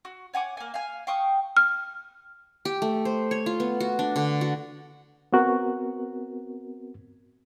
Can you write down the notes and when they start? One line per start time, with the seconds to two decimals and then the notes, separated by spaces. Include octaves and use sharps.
0.05 F#4
0.34 C#5 F#5 G#5 D6
0.57 A#3 G#5
0.74 F5 G#5
1.07 F5 G5 C#6 D#6
1.57 F6
2.65 G4
2.82 A3
3.05 C5
3.31 C#5
3.46 F4
3.60 B3
3.80 F#4
3.99 D4
4.16 D3
4.41 F#4
5.33 B3 C4 F#4 A#4